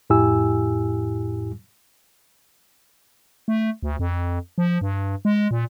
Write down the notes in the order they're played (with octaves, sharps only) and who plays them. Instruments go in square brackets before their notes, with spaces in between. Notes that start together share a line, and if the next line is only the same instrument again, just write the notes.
[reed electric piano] F2 A2 E4 G4 G#5 E6
[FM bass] A3
D2
F2
F3
G2
G#3
A#2